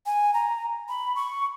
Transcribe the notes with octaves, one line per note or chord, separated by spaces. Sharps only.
G#5
A#5
B5
C#6